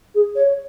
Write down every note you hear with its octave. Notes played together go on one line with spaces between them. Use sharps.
G#4
C#5